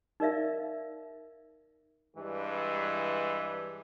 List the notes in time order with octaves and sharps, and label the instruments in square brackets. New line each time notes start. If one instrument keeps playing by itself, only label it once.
[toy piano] D#4 A#4 D5 E5 F5
[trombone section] G2 E3 G#3